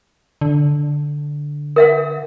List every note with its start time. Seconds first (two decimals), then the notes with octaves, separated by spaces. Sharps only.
0.41 D3
1.76 A#4 E5 F#5